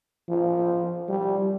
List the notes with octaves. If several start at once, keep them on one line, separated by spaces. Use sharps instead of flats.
F3
G3